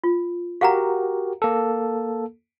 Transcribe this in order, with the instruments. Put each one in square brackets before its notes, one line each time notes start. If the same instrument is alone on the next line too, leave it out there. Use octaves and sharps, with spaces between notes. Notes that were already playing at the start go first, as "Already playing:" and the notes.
[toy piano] F4
[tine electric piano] F#4 G4 A#4 [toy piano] F5 F#5 A#5
[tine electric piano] A#3 A4